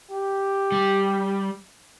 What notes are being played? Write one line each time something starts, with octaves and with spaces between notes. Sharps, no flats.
G4
G3